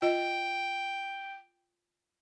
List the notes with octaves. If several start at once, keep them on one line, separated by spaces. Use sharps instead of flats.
F4 D#5 G5